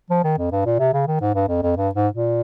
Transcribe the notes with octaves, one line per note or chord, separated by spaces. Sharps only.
F3
D#3
F2
G2
A#2
C3
C#3
D#3
G#2
G2
F2
F2
G2
G#2
A#2